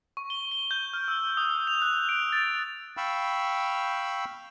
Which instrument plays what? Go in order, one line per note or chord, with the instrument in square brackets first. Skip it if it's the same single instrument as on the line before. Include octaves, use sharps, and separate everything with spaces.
[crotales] C#6
G7
G7
G6
F6
E6
D#6
F7
F#6
D7
A6
[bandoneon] F5 G5 B5 C#6 E6